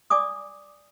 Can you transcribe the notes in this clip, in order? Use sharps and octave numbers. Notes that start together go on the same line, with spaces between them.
D5 G#5 D6 D#6